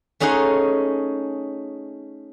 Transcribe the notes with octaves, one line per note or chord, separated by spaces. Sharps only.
A3 C#4 D#4 G#4 F#5 C6